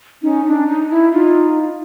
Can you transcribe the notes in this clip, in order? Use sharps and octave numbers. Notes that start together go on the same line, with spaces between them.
C#4 D#4
D4
D#4
E4
D#4 F4